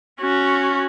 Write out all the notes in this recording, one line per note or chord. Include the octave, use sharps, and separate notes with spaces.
C#4 F#4